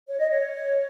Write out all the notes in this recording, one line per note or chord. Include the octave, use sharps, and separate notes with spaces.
C#5
D#5
C#5